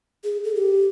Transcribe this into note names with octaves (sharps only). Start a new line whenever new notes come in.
G#4
A4
G4